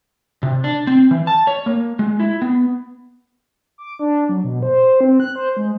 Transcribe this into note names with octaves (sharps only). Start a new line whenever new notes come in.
C3
D4
C4
E3
A5
C#5
A#3
G#3
E4
B3
D6
D4
F#3
B2
C5
C4
F#6
C5
G#3